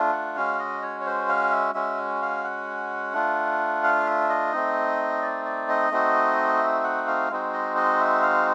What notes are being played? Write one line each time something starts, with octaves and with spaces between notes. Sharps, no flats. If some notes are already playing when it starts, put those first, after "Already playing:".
Already playing: A3 D4 F4
F#5
G#3 C#4 F#4 F5
D#5
C#5
C#5
C5
F5
E5
G#3 C#4 F#4 E5
F5
F#5
A3 D4 F4
F5
E5
D#5
A3 C4 D#4
D5
D5
D#5
A3 C4 D#4 F#4
E5
F#5
F5
G#3 C4 D#4 F#4
D#5
D#5
E5
F5